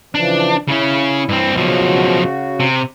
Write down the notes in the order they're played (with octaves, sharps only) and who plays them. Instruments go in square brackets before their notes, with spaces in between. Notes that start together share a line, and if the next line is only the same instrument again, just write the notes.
[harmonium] C#3 E3 F3 [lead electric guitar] D4
[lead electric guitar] C#3 C#4 [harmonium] E4
[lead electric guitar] G2 C4
[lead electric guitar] B1 F3 [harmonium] C#3 F#4
[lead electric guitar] C3